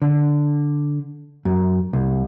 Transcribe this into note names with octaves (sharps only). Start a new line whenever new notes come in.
D3
F#2
C2